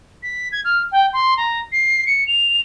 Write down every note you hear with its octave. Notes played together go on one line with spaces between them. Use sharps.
B6
G#6
F6
G5
C6
A#5
C7
C#7
F7